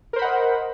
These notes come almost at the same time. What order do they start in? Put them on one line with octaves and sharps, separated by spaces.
A#4 C5 B5 F#5 D#5